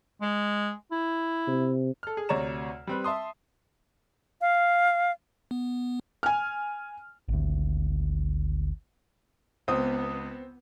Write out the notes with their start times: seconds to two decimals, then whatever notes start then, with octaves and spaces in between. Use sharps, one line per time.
0.22 G#3
0.92 E4
1.47 C3
2.03 A4 F6
2.17 G#4
2.29 D2 C3 C#5 D5 A#5 E7
2.87 G3 C4 B4
3.04 E5 A5 C6 D#6
4.41 F5
5.51 B3
6.23 G#5 F6
7.29 G#1 D2
9.68 C#2 B3 C4 D#6